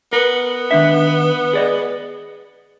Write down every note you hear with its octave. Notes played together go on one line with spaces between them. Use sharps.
B3 A#4
D#3 D4 E5
G#4 D5 D#5